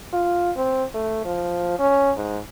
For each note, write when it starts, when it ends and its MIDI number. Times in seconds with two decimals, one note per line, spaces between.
0.13 0.51 65
0.56 0.84 60
0.94 1.21 57
1.25 1.75 53
1.79 2.11 61
2.17 2.39 44